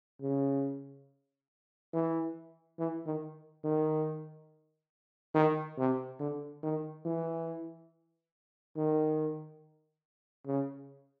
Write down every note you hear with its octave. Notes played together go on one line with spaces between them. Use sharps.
C#3
E3
E3
D#3
D#3
D#3
C3
D3
D#3
E3
D#3
C#3